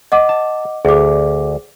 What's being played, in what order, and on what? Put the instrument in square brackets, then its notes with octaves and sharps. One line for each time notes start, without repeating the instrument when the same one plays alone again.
[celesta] D#5 F#5 D6
[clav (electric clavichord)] A5
[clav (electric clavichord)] D2 [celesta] G#4 D6